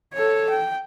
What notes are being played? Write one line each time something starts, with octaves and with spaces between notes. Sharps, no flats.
A4 C#5
G5